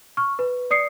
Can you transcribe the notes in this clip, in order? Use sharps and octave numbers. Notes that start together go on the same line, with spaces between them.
C#6 F6
B4
D5 D#6 C7 C#7